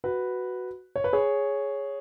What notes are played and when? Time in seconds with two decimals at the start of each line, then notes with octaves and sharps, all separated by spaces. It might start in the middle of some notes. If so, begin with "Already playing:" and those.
0.04 F#4 B4
0.96 C#5
1.04 B4
1.13 G#4 C#5